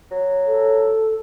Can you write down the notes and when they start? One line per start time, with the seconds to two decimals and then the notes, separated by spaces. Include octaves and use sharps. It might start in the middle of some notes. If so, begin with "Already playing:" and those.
0.11 F#3
0.46 A4